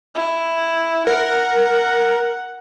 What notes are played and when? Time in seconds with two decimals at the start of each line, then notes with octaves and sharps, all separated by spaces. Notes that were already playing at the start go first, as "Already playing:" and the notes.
0.15 E4
1.07 A#4 F#5